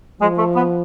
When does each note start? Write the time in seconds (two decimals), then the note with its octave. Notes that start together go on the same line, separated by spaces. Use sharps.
0.20 F3 G#3
0.38 A3
0.56 B3